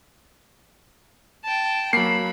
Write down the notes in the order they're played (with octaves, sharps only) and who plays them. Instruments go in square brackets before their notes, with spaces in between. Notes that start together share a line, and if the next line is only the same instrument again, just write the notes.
[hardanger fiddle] G5 A5
[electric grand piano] F#3 A#3 [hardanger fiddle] B5 [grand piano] C7